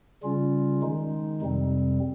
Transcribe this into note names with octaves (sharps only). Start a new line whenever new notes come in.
C#3 G3 C#4 F4
D#3 G#3 D#4
F2 C3 G3 C4